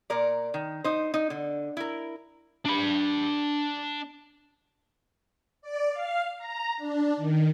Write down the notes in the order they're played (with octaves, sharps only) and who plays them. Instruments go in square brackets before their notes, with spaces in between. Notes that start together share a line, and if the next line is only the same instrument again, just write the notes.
[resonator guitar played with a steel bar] A#2 A#4 D5
D#3
D#4 C5
D#4
D3
E4 A#4
[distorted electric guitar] D4 B5
[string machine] D5
F5
A#5
D4
D#3